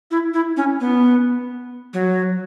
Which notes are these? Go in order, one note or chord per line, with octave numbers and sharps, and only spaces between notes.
E4
E4
C#4
B3
F#3